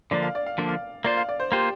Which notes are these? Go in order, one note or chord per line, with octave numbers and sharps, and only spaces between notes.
D3 F3 A#3 D4 D5
F5
D5
F5
D3 F3 A#3 D4
F5
A#3 F4 C5 D5
F5
D5
C5
A#3 F4 G4 C5